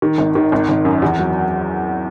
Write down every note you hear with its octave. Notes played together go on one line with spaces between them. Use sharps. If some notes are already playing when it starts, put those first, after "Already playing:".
D#3
G#1
D#3
G#1
G#1
F#2
E2
F#3